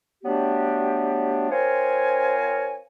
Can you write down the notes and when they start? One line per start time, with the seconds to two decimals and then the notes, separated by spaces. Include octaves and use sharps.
0.25 F#3 G3 A3 B3 D4 G4
1.51 C4 F4 A#4 C5 C#5 G#5